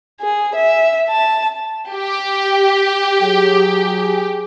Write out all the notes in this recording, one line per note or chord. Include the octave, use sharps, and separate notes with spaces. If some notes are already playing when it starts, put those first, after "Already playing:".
G#4
E5
A5
G4
F#3 G#4